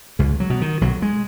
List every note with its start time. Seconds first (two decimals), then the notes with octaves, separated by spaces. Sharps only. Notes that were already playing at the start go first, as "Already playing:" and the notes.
0.19 C#2 G#3
0.40 F#3
0.50 B2
0.61 D#3
0.81 B1 F#3
1.02 G#3